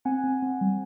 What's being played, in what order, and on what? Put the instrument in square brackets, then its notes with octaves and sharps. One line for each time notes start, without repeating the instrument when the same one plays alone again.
[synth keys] C4 F#5 G#5
C4
C4
G3